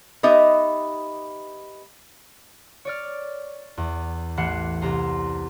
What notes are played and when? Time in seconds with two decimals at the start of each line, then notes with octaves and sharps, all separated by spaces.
0.23 B3 D#4 G4 D#5 E5
2.85 C#5 D5 F6
3.77 E2
4.37 A1 E3 F#5 C7 C#7
4.82 C2 A#5 C6